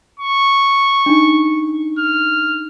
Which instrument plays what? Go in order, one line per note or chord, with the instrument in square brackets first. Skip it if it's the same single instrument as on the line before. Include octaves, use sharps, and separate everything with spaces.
[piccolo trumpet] C#6
[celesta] D4 D#4
[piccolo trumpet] F6